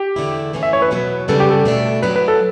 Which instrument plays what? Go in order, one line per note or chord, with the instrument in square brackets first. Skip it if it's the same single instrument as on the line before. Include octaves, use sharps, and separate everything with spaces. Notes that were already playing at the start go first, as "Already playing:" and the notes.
Already playing: [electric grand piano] G4
[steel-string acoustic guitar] E2 D3 A3 E4
A2 E3 A3 C#4 E4
[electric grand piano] E5
C#5
B4
[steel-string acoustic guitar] E2 B2 F#3 B3
[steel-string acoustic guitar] C#3 G3 B3 D4 [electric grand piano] A4
[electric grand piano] G4
A4
[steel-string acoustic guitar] B2 A3 D4
[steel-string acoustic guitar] A2 F#3 B3 D4 [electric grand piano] B4
[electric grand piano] B4
A4